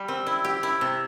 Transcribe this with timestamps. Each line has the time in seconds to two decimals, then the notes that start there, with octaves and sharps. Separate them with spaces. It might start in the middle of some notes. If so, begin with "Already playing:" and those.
Already playing: G3 G4
0.08 C4
0.27 E4
0.44 G4
0.63 E4
0.81 C3